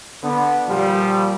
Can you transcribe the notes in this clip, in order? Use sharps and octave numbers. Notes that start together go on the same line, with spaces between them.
D3 B3
A#2 F3 G3